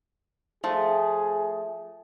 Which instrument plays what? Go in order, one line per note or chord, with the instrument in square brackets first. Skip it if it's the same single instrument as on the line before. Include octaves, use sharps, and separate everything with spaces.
[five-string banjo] F3 [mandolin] A3 [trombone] G#4